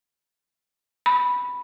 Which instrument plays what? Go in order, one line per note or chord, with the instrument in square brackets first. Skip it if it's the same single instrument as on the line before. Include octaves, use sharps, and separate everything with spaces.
[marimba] B5